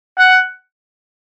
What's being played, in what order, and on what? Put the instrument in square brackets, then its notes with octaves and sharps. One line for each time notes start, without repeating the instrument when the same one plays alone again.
[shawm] F#5